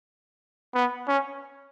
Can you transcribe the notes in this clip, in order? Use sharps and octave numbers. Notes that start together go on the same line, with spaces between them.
B3
C#4